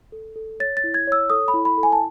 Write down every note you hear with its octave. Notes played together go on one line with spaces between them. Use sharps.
A4
A4
C#5 A6
A6
E4
G#6
C#5 E6
A4 D#6
B5
E4
B5
A4
G#5
A5